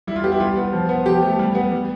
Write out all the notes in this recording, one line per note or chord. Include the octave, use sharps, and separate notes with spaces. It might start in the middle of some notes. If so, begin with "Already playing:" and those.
G3 E4
F4
B3 G4
E4
G3 F4
B3
F3
B3
F3 G4
A3
G3
B3
G3